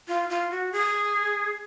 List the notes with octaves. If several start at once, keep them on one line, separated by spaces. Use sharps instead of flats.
F4
F4
F#4
G#4